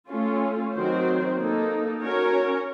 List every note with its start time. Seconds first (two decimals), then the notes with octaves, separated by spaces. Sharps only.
0.10 A3 C#4 F4 A4
0.74 D#3 F#3 C4 F#4 C5
1.37 A#3 D#4 A4
2.01 C#4 F#4 A#4 C#5